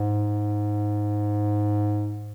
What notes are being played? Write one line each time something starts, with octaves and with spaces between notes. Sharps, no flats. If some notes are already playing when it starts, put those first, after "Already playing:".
Already playing: G#2